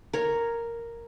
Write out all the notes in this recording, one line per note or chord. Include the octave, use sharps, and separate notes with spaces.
A#4 C#5